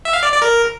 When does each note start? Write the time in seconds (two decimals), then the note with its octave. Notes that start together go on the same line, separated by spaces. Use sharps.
0.05 E5
0.13 F5
0.23 D5
0.33 D5
0.42 A#4